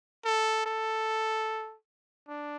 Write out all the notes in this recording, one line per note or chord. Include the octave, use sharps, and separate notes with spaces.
A4
A4
D4